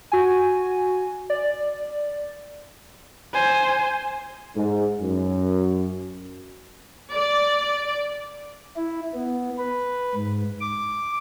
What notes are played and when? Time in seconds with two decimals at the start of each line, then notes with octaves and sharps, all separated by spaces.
0.12 F#4 G#5
1.30 D5
3.34 C5 G#5
4.56 G#2
5.01 F#2
7.13 D5
8.76 E4
9.14 B3
9.58 B4
10.15 G#2
10.61 D6